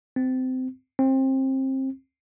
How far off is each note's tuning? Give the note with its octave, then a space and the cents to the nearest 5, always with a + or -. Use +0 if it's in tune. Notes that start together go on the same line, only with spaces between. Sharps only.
C4 -25
C4 +25